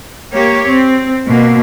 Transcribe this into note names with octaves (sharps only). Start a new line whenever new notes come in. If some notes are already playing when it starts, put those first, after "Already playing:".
A#3 G4 C#5
C4
B2 A#3